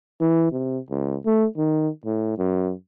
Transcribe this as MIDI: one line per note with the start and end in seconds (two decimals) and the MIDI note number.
0.21 0.50 52
0.52 0.78 48
0.90 1.17 37
1.26 1.46 57
1.58 1.88 51
2.05 2.36 45
2.38 2.72 42